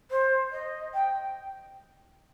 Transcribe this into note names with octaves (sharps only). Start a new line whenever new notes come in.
C5
D#5
G5